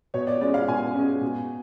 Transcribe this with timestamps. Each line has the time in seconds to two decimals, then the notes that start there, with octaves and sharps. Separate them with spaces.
0.14 B2 C#5
0.27 D5
0.41 G#3 C#4 D5
0.54 F5
0.68 B2 G#5
0.95 G#3 C#4
1.21 B2